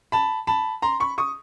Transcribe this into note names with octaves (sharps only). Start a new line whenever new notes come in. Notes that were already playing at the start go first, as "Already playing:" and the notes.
A5 B5
A5 B5
A#5 C6
B5 C#6
C#6 D#6